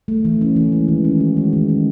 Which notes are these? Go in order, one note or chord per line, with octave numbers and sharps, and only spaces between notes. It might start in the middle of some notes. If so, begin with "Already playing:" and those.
A3
E3
C#4
E3
G#3
D#3
C#4
F#4
G#3
D#3
C#4